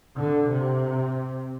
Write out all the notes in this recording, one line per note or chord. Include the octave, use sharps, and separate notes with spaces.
D3
C3